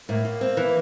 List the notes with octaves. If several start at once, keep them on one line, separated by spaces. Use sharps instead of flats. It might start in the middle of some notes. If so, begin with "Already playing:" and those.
A2 A#3
A2
C4
E3